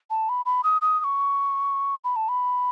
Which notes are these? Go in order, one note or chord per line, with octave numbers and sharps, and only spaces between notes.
A5
B5
B5
D#6
D#6
D#6
C#6
B5
A5
B5